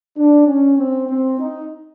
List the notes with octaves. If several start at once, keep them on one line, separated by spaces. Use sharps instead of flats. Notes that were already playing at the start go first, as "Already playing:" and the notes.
D4
C#4
C4
C4
D#4